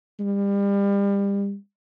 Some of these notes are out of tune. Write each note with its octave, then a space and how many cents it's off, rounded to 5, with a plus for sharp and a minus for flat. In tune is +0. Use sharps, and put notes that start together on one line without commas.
G3 +30